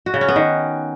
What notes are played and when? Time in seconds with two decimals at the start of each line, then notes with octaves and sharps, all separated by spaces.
0.06 F#4
0.14 C#3
0.21 C#4
0.28 B3
0.36 D#3